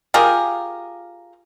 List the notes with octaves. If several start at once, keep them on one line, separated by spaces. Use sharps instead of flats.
F4 G4 G#4 A#4